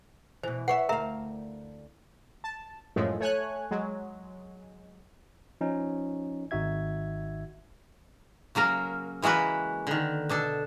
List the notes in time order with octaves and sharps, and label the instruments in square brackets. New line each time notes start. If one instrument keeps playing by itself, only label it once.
[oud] B2 E3 [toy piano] C5
[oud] B4 C#5 E5 [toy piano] F#5 C#6
[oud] D2 F5 [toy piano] A#4 E5 A#5
[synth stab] A5
F#2 A2 F3 G#3 A3
A3 C#5 G#5 F#6
F#3 G#3
[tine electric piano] F3 C#4 D#4
G#1 D#4 F#4 E5 G#6
[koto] C#3 F#3 A#3 A#4
E3 G#3 A#3 F#4 B4
D3 D#3
B2 D4 A4